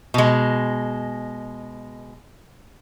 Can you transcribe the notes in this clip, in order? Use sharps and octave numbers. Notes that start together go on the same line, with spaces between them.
B2 G#3